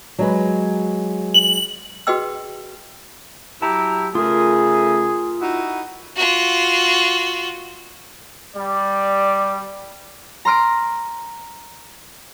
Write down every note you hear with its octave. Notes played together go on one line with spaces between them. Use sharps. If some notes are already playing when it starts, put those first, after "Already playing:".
F#3 G#3 B4
F#7
F#4 G#4 B4 D#5 G5 E6
F#3 E4 G4 A5 A#5
C#3 A3 F4 G#4 A#4
D#4 E4 F#4
F4 F#4
G3 D5
A#5 C6 F6 D7